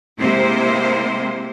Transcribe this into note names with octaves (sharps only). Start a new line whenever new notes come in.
C3 G#3 A#3 E4 C5